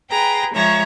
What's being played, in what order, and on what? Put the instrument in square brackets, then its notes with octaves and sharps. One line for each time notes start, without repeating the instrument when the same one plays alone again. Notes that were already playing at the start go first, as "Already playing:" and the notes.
[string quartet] G#4 B4 G5 A#5
F3 G#3 C#5 E5 A#5